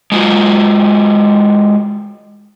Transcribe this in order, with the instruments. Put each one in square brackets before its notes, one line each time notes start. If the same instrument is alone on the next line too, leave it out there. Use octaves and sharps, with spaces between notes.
[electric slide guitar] G#3 F4 F#4